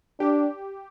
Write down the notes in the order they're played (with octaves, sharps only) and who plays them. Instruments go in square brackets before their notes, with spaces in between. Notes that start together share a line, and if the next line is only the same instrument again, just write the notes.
[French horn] D4 [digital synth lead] G4